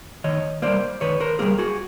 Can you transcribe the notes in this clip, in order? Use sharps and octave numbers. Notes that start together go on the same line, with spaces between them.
D#3 C#5 D#5
G3 A#3 C5 D5
D#3 B4 C#5
A#4 C5
G3 A#3 G#4 A#4
F#4 G#4